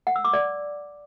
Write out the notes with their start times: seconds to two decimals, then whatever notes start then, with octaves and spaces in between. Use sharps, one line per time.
0.07 F#5
0.16 E6
0.25 D6
0.33 D5